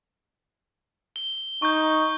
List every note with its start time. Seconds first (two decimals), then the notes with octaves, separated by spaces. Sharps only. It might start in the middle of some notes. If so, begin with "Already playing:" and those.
1.16 G7
1.62 D#4 C#6 G6